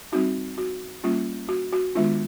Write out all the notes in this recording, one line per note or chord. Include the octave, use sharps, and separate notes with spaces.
G3 C4 D#4 F#4
F#4
G3 A#3 C#4 F4
F#4
F#4
D#3 G#3 B3 D4 F4